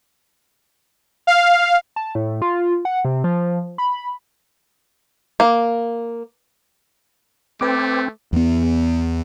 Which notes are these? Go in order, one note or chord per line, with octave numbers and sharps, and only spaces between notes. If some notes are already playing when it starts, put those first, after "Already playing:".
F5
A5
A2
F4
F#5
C3
F3
B5
A#3
A3 C4 B4 D6
E2 B3